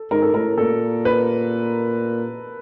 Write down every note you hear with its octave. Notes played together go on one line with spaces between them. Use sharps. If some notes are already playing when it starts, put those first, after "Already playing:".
Already playing: A4
G#2 A#4
A4
A2 A#4
A#2 A4
B4